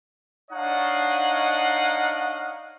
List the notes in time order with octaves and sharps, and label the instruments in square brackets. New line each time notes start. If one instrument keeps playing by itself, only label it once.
[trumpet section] D4 D#4 C#5 D#5 F5 F#5